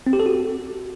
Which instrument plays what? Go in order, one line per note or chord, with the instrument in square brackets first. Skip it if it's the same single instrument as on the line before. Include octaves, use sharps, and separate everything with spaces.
[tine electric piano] C4
G4
A4
F#4